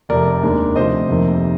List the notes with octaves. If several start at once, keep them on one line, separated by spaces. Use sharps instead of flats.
F1 F2 C3 A#4 D5
D#2 D#3 G#3 D4
D2 C3 F3 C5 D#5
F1 F2 C3 D#3 A#3